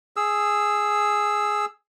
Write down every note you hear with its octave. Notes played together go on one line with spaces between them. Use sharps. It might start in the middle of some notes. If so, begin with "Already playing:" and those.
G#4 E6